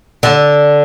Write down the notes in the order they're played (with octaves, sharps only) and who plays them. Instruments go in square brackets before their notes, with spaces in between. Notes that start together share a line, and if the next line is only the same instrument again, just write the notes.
[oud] D3